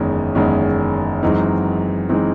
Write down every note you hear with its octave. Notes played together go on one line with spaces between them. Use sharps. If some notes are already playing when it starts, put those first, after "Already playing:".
Already playing: F#1 E2 D#3 G#3 C#4
F#1 E2 D#3 G#3 C#4
F#2 E3 G#3 C4 D#4
E3 G#3 C4 D#4